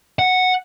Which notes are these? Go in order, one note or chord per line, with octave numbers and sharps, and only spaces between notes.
F#5